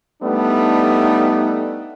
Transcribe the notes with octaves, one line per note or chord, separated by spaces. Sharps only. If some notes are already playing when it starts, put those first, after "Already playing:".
G3 A3 B3 D4 D#4